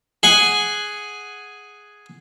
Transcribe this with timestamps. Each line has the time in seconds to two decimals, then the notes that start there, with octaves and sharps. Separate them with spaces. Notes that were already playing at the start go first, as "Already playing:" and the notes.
0.23 G#4 F#5 G#5